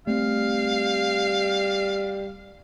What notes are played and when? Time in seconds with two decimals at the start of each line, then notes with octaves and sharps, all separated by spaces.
0.07 G3 A3 C4 F5